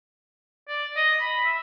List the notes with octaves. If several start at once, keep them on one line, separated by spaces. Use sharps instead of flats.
D5
D#5
B5
E5